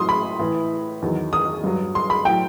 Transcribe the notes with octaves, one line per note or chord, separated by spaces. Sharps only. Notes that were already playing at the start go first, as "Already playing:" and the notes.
Already playing: A2 F#3 C6 D#6
B5
A2 E3
E2 D#3 F#3
D#6
G2 F#3
C6
B5
A2 F#3 G5